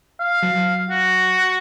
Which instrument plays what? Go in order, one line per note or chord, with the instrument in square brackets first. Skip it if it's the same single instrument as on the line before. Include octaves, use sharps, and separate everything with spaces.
[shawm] F5
[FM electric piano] F#3
[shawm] F#4